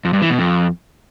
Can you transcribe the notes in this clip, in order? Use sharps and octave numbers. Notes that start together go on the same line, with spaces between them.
F2
G2
E3
B2
F2